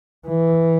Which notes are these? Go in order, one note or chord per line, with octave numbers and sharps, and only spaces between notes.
E3